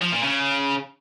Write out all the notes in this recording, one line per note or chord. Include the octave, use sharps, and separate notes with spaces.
F3
A#2
C#3